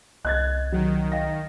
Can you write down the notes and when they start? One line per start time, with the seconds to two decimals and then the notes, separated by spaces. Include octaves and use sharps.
0.25 C2 D#5 F#6 G#6 A6
0.72 D#3 F#3
1.12 D#5 F5 G5 A#6